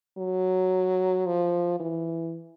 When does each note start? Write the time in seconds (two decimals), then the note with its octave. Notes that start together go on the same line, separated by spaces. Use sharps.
0.18 F#3
1.26 F3
1.80 E3